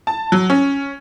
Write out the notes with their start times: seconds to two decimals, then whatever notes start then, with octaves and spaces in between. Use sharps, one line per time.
0.07 A5
0.32 F#3
0.50 C#4